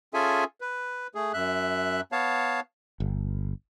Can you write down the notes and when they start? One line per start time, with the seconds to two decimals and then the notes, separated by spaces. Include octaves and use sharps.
0.14 C#4 F4 G#4 A4 E5 G#5
0.61 B4
1.15 A3 G#4
1.34 F#2 E5 F#6
2.12 B3 C#5 F5 A5
3.00 G1